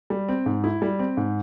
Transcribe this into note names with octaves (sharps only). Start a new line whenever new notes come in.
G3
C4
G#2
E4
G3
C4
G#2